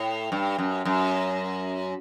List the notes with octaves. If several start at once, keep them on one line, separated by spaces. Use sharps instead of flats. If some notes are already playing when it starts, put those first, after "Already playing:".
Already playing: A2
G2
F#2
F#2